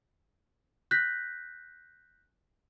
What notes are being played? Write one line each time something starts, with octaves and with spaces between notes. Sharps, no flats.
F#6 G6 A#6 B6